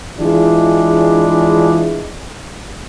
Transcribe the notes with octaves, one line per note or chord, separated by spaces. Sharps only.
E3 G#3 D4 E4 F4 G#4